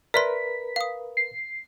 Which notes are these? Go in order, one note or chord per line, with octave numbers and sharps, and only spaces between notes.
A#4 B4 D5 E5 C6 B6
F5 D#6
C7